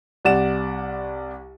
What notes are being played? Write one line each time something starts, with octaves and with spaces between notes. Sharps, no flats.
C2 C3 D5 F#5 E7